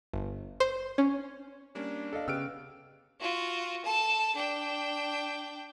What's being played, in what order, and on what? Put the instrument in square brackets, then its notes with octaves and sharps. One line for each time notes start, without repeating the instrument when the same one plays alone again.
[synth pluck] G1
C5
C#4
[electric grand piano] G3 A#3 C#4 [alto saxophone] D4
[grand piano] A4 D#5 F5
[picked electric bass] C#3 [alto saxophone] B3 [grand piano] G4 [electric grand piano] E6 F6 D7
[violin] F4 F#4
A4 A5
D4 G5